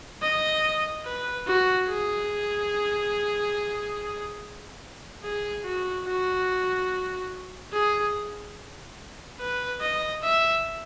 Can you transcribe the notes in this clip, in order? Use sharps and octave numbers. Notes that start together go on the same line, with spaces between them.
D#5
B4
F#4
G#4
G#4
F#4
F#4
G#4
B4
D#5
E5